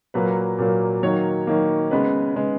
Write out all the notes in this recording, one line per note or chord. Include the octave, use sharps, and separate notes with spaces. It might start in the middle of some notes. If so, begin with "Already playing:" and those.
A#2 F#3 A#3 B4
A#2 F#3 A#3
D#3 F#3 A#3 C#5
D#3 F#3 A#3
C#3 G#3 B3 B4
C#3 G#3 B3